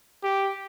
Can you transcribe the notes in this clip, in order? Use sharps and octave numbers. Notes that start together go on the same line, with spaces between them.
G4